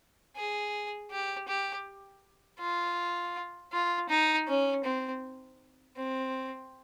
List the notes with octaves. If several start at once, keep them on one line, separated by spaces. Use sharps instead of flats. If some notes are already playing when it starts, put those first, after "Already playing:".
G#4
G4
G4
F4
F4
D#4
C#4
C4
C4